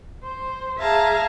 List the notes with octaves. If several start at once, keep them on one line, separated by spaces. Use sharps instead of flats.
C5
G#4 E5 F5 A5 A#5